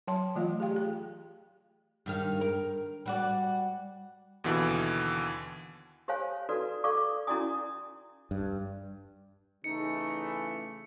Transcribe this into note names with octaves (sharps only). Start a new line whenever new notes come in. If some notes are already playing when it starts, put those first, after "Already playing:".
F#3 C#5 G5 A5 C6
E3 A3 F4 D#5 F5
G4 G#4 F5 G5
G#4
G2 D#3 F5
A#4
G3 F#4 D5
D#2 B2 D3 E3
G4 C5 C#5 F5 G#5
F#4 A4 B4 D5
A4 D5 F5 C#6 D6
C#4 E4 F#4 D5 G#5 D#6
G2
C#3 E3 A3 D#4 C#7